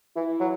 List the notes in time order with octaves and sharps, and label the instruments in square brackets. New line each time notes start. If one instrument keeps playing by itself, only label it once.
[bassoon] E3 [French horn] E4
[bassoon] F#3